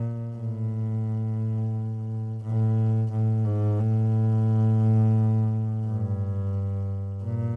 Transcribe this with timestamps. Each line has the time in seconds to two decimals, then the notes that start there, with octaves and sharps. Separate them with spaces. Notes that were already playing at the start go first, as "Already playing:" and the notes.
Already playing: A#2
0.37 A2
2.43 A2
3.11 A2
3.45 G#2
3.80 A2
5.86 G2
7.24 A#2